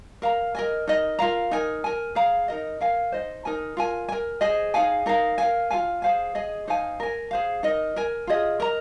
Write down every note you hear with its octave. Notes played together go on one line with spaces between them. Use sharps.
A#4 F5 A#5
A#4 D#5 G#5
D#4 A#4 D#5
F4 A#4 F5 A#5
D#4 A#4 G#5
A#4 G#5
G#4 F5 A#5
D#4 A#4 D#5
A#4 F5 G#5
D#4 C5 D#5
D#4 A#4 G#5
F4 A#4 G#5
A#4 G#5
G#4 C5 D#5 G#5
D#4 G#4 F5 G#5
D#4 A#4 F5 A#5
A#4 F5 G#5
F4 A#4 F5 G#5
G#4 C5 F5 G#5
G#4 D#5 G#5
D#4 C5 F5 G#5
A#4 G#5
G#4 C5 F5
D#4 A#4 D#5
A#4 G#5
F4 G#4 D#5
A#4 D#5 A#5